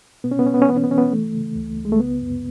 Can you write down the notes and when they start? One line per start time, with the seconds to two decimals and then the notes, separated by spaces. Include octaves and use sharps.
0.24 B2 B3
0.31 C#4
0.39 B3
0.46 B2 C#4
0.54 B3
0.62 C#4
0.68 E3 B3
0.76 C#4
0.83 B3
0.90 E3 C#4
0.98 B3
1.12 E3 A3
1.34 C#3
1.56 C#2
1.78 C#2
1.85 G#3
1.92 A3
1.99 C#3 B3
2.21 F#2